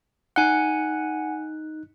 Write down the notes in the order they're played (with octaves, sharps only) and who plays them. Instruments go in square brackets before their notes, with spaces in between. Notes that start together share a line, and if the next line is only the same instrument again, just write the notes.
[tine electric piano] D#4 F#6 [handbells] F#5 G#5